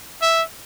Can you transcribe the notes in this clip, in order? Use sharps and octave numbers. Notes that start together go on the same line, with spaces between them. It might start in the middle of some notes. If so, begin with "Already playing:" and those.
E5